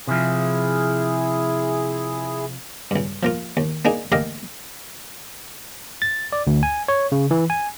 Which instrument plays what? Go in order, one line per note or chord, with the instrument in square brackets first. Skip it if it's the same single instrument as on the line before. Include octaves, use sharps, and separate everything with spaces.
[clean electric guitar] C3 F3 [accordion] E4 G#4
[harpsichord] C#2 G2
F3 A#3 F4
D#2
A#3 D4 D#4 G#4
A1 D3 A#3 G4 D#5 F5
[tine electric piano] A6
D5
D2
G#5
C#5
C#3
E3
G#5